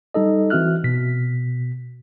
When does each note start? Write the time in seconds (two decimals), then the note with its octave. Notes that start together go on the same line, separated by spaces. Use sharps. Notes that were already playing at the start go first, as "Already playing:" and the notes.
0.14 G3 D#4 A4 D#5
0.50 E3 C4 F#4 E5 F6 F#6
0.84 B2 B6